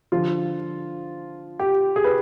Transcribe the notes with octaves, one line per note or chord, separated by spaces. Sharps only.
D3 F3 F4
G4
G#4
B4